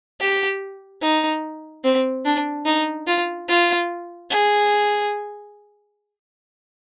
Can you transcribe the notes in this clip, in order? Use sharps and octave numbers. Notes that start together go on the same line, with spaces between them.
G4
D#4
C4
D4
D#4
F4
F4
G#4